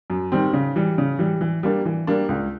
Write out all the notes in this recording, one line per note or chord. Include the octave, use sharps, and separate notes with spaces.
F#2
D#3 G3 C4
C#3
E3 G3
C#3
E3 G3
E3
G3 A#3 D4
E3
G3 A#3 D4
C#2